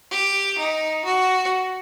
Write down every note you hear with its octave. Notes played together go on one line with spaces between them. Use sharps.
G4
D#4
F#4